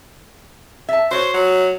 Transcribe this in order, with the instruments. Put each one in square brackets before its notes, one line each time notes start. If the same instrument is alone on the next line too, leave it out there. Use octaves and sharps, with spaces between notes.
[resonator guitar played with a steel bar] E5 A5
[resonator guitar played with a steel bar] F#4 C#5 [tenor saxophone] C5
[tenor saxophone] F#3